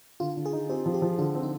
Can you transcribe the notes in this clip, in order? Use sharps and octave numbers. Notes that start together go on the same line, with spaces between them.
D3 F4
D3
G#4
D#4
C4 G4
F3
G4
F3
D3 F4
C4
D#4